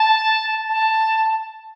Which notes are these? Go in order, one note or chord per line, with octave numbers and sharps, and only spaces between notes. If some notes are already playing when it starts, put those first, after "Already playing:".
Already playing: A5
A5